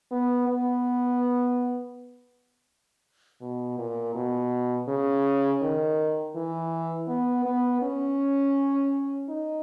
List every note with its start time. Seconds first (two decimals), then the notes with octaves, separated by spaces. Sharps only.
0.11 B3
0.48 B3
3.41 B2
3.78 A#2
4.15 B2
4.88 C#3
5.62 D#3
6.35 E3
7.08 B3
7.45 B3
7.82 C#4
9.29 D#4